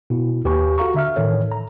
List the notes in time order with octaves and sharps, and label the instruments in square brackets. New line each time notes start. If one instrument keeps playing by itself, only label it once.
[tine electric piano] B2 E4
D#2 G4 B4 G#5 C#6
F#4 A4 F5 A#5 C#6
D3 E5 F6
A2 D#3 E3 A4 C#5
A#5